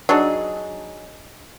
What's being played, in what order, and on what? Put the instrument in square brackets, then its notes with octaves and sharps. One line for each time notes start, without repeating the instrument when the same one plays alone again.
[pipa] F#3 D4 D#4 G#4